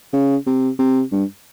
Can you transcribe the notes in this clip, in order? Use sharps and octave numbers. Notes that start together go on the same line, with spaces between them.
C#3
C3
C3
G2